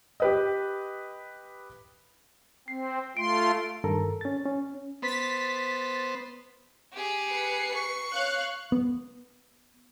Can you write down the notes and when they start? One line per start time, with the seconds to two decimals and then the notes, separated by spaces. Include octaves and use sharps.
0.20 G4 B4 D#5
2.68 C4 C7
3.17 A3 F4 C6 D7
3.84 G2 D#3 A4 A#4 A#5
4.21 C#4 A6
4.46 C#4
5.02 B3 C5 A6 B6
6.93 G4 G#4
7.27 B4 C7 C#7
7.74 C#6
8.13 C#5 F5 F#6
8.72 B3